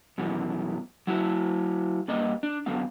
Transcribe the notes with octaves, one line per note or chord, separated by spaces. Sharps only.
F#2 B2 E3
F#3 E4 F#4
G2 A#3 D5 D#5
D4
F#2 D3 B3 F5